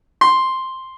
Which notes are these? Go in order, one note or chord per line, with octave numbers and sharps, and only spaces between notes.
C6